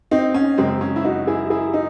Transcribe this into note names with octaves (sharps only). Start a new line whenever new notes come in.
C4 D#4
C#4
F#2 C#3 G#3 C4
C#4
E4
D#4 F#4
E4 G#4
E4 G#4
D#4